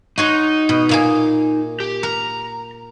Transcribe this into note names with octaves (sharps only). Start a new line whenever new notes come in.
D#4 F#4 C#5 C6
B2
A#2 A#3 G#4
G4
A#4 A#5